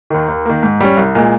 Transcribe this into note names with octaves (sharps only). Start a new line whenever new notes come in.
D#2 D#3
D#2
D#3 A#3
G#2
G3 C#4
C2
A#2 G#3